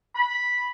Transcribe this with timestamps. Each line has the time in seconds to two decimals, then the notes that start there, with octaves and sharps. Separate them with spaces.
0.15 B5